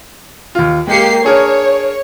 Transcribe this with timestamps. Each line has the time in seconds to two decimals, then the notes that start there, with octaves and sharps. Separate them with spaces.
0.55 D#2 F4
0.87 G#3 A#3 G4 C7 C#7
1.24 D4 G#4 A#4 C#5